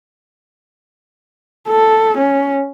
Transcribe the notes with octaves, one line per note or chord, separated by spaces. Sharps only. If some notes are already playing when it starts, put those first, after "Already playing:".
A4
C#4